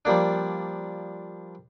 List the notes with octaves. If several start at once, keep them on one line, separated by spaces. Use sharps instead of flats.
F3 G3 A#3 D4